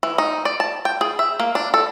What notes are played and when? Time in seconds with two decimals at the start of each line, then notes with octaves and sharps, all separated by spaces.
0.03 E3
0.18 D#4
0.45 D5
0.60 A5
0.85 G5
1.01 G#4
1.19 E5
1.40 A#3
1.55 D4
1.74 A4